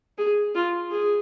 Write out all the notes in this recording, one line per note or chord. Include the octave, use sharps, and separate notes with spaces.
G#4
F4
G#4